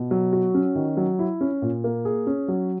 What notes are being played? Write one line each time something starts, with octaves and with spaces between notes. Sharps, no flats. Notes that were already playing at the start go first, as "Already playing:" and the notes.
Already playing: B2
F#3
F#4
C#4
D#3
F#3
E4
C#4
A#2
A#3
G#4
C#4
F#3